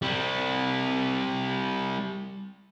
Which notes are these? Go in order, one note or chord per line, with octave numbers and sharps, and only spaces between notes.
G3 C4